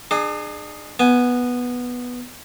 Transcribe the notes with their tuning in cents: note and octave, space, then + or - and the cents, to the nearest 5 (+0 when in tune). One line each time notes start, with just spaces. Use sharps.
D4 +40 G#4 +0
B3 -5 G#5 +0